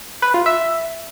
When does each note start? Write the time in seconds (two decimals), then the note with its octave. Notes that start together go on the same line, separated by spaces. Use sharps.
0.22 B4
0.34 F4
0.46 E5